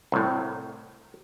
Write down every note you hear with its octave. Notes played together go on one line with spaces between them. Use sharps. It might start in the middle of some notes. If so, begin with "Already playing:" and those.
C2 A2